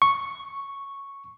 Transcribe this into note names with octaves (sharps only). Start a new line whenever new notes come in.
C#6